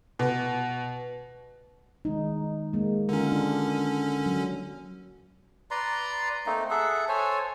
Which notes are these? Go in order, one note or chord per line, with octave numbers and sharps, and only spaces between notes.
B2
D#3 G#3 D#4
G#3 A#3
D3 C#4 F4 A#4
D4
F#3
B4 D5 A#5 C6
A3 A#3 C4 D#4
G#4 A4 E5 F#5
A4 C5 C#5 G#5